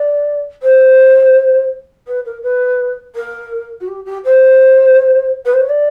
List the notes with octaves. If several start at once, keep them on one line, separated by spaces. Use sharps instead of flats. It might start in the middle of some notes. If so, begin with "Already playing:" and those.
Already playing: D5
C5
B4
A#4
B4
A#4
F#4
G4
G4
C5
B4
C5
C#5
D5